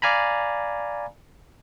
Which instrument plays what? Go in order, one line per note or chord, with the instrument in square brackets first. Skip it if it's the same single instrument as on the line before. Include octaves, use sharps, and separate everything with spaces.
[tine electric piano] D5 F5 G#5 A#5 B5